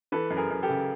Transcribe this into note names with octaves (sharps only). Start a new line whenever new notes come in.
E3 A4 B4
F#2
G#4 A#4
F#2
G4 A4
C#3